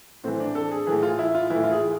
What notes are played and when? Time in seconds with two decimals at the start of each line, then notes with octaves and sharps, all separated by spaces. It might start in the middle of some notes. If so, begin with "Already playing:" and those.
0.24 A2 E3 C4
0.40 D4
0.55 A4
0.71 G#4
0.87 A2 E3 G#4
1.03 F4
1.19 E4
1.35 F4
1.50 A2 E3 E4
1.64 F4
1.72 G#4